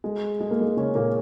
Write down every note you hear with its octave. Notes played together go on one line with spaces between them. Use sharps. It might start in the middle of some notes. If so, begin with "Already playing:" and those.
G#3
G#3
A#3
G#3
C#3 C#4
A#2 A#3